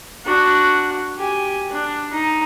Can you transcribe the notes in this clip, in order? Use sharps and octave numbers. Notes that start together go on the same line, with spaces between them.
D4 F#4
G4 G#5
D4
D#4